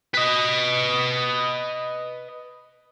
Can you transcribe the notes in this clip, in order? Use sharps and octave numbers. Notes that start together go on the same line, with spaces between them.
B4 D#5